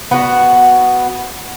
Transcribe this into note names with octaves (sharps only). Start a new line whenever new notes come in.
B3 F#4